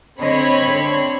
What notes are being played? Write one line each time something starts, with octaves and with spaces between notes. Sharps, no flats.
D3 C4 C#5 D#5 B5
D3